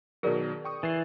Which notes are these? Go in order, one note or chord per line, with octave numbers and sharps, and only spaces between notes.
B2 D#3 F#3 G#4 A#4 D5
G5 C#6 D#6
E3 A6 C7